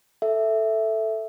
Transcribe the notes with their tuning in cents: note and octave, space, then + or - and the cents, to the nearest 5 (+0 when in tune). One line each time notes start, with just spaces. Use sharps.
A4 +0 E5 +0